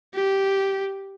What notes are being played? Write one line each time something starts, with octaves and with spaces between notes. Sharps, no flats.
G4